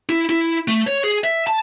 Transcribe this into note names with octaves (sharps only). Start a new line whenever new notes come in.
E4
E4
A3
C#5
G#4
E5
A5